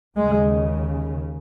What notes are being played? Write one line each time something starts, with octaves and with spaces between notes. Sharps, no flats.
D#2 C#3 G#3